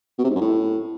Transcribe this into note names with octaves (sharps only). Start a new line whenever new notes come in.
B2
C3
G#2
F#2
A2